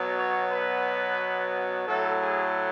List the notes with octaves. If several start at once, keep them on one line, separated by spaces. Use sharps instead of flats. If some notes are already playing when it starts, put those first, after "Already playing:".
Already playing: B2 F#3 B3
C#5
B4
A2 F#3 A3 A4
G#4